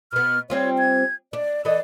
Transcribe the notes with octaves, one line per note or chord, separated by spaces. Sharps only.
B2 B3 F6
G3 C4 F4 C#5
G#6
D4 D5
E3 A4 D5 D#5